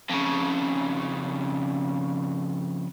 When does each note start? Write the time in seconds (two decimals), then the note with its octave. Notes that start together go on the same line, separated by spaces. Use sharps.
0.09 F2 C#3